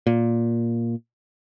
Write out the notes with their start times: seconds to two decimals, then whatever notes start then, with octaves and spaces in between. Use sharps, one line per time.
0.07 A#2